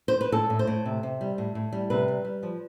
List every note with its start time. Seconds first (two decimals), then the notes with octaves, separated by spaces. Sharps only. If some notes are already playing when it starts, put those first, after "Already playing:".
0.08 C5
0.21 B4
0.32 A2 A4
0.50 A2
0.59 C5
0.67 A2
0.85 C3
1.03 C3
1.21 G3
1.38 A2
1.55 A2
1.72 G3
1.90 C3 B4
2.08 G3
2.25 G3
2.43 F3